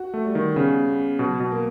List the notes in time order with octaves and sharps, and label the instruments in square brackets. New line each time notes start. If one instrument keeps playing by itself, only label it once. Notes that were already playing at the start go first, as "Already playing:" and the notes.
Already playing: [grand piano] F#4
[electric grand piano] A3
[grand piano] G3
[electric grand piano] D#3
[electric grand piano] C#3 [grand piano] B3
[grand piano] B3
[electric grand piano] B2 [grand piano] F#3
[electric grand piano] B2
[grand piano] A#3